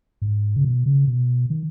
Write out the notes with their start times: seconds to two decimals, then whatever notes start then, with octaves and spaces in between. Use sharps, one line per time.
0.22 G#2
0.56 C#3
0.64 B2
0.86 C#3
1.07 B2
1.50 D#3